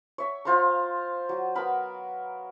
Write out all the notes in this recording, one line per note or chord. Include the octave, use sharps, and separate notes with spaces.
C#5 E5
F4 C5 F5 A#5
F#3
B3 A#4 B5